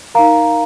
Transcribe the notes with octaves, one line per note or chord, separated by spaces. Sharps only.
D#4 A#4 F5 A#5